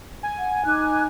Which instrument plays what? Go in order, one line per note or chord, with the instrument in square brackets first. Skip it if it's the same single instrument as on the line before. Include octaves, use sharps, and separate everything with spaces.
[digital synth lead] G#5
[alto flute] F#5
[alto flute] D#4 [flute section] D6 F#6